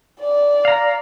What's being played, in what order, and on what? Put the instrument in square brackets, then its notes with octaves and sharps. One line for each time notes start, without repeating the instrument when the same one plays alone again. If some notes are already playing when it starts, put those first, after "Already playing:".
[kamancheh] D5
[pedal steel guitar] F5 A#5